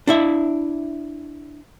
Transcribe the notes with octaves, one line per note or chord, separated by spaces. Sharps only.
D4 E4 E5